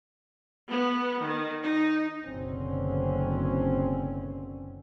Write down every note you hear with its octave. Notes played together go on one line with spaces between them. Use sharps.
B3
D#3
D#4
F#1 B1 D3 C4 C#4